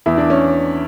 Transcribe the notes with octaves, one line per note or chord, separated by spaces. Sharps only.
E2 E4
D4
C#4